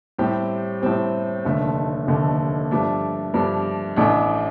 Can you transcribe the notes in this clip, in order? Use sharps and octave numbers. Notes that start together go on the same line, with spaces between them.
A2 G3 C4 G4
A2 G3 C4 G4
F1 D#2 D3 A3
F1 D#2 D3 A3
G2 F3 A3 D4
G2 F3 A3 D4
A1 A2 A3 D4